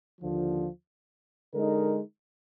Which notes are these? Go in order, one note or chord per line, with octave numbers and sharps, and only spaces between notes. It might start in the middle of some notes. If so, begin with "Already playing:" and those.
D#2 D3 F3
D3 G#3 D#4 A#4